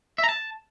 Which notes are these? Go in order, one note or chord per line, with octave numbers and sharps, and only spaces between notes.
E5
A#5
A5